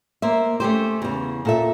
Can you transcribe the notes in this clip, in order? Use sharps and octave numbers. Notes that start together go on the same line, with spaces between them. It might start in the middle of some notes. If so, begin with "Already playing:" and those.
A#3 C5 E5
A3 C#4 G4 C5
E2 C#3
A#2 A4 E5